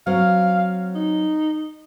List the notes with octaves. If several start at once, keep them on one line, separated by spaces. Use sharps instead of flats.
F#3 C4 F5
D#4